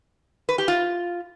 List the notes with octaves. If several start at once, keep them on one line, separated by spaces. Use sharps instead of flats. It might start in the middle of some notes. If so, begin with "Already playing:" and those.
B4
G4
F4